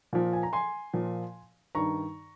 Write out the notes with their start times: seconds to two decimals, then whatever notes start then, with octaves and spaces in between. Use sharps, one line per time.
0.13 A#2 F3
0.33 G#5
0.43 A#5
0.53 G#5 C6
0.93 A#2 F3
1.75 G2 D#3 A#5 C#6